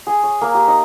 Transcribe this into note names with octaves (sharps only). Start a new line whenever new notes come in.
G#4
C#5
A#3
G4
D#4